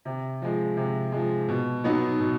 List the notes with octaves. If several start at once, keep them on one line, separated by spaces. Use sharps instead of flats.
C3
F3 G#3
C3
F3 G#3
B2
F#3 B3 D#4 F#4
B2